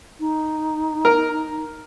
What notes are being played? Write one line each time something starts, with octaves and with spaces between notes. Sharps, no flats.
D#4
A#4